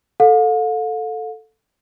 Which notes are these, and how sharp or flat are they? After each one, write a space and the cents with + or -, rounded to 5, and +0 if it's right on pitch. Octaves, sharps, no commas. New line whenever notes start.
A4 +0 F5 +45